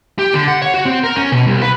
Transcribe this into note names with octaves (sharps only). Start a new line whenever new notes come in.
G4
D3
F#5
C#5
F#4
C4
A#4
C#4
B2
C2
B4